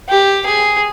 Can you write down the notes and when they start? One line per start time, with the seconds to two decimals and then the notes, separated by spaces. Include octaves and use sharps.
0.09 G4
0.45 G#4